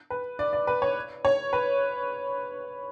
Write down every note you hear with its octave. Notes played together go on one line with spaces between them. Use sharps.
B4
D5
D5
B4
C#5
C#5
B4